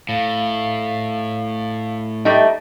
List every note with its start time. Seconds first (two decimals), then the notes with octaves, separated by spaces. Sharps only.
0.09 A2 F5
2.25 G3 A3 D#4 E5 A5